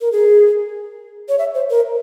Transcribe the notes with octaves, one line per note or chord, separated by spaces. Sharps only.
A#4
G#4
C#5
E5
C5
A#4